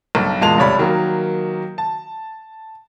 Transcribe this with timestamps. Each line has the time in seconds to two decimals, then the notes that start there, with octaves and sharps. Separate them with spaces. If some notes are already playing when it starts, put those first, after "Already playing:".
0.15 B1 G2
0.41 E2 A#2 G#3 A5 F7
0.58 F1 G3 C#5 D5 B5
0.79 D#3 F#3 A#3
1.78 A5